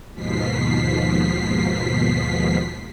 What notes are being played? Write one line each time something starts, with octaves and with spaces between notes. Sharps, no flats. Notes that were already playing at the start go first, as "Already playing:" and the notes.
D#2 G#2 B2 F3 B6 C7